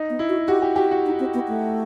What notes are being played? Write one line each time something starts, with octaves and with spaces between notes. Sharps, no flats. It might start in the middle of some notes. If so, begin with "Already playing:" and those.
Already playing: D#4
B3
E4
F#4
F#4 G4
G4
F#4 G4
F#4
D#4
C4
B3
A3